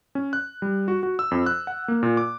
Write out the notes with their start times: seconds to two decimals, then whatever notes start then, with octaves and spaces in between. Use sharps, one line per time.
0.15 C#4
0.33 F#6
0.62 G3
0.88 F#4
1.03 F#4
1.19 E6
1.31 F2
1.46 F#6
1.67 F#5
1.88 A#3
2.03 A#2
2.17 D6